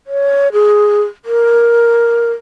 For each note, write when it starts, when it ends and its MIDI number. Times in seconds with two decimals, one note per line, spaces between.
0.07 0.48 73
0.53 1.02 68
1.25 2.32 70